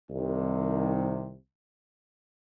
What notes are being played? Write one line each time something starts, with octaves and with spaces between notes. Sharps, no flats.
C2 C3 D#3